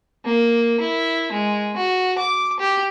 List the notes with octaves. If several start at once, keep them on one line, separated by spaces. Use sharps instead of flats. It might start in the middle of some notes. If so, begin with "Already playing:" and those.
A#3
E4
G#3
F#4
D6
G4